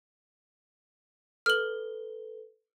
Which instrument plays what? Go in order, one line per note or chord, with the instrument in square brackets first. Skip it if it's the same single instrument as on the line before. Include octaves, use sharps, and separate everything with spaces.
[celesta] A4 B4 G7 [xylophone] F6 F#7